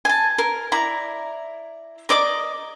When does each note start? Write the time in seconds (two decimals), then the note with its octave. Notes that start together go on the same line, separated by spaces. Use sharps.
0.05 G#5 A5
0.38 A#4
0.72 E4 D5 A#5
2.09 A#4 D5 D#5 D6